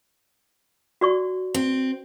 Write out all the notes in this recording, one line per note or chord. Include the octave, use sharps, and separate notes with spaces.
F#4 D5 C#6
C4